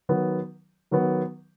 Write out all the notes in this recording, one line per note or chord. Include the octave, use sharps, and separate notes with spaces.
D#3 F#3 B3
D#3 F#3 B3